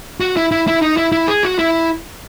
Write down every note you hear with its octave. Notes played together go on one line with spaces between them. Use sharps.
F#4
E4
E4
E4
D#4
E4
E4
G#4
F#4
E4